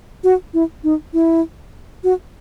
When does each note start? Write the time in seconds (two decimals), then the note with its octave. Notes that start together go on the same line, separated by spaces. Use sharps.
0.24 F#4
0.54 E4
0.84 D#4
1.14 E4
2.04 F#4